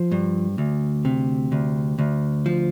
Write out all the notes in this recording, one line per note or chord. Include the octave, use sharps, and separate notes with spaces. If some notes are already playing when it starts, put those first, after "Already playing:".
Already playing: F3 C5
G2
D2
C3
D2
D2
F3